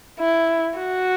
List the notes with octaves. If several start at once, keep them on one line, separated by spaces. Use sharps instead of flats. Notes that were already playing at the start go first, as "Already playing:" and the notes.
E4
F#4